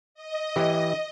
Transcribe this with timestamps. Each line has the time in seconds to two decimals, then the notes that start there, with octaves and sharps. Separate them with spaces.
0.15 D#5
0.56 E3 G4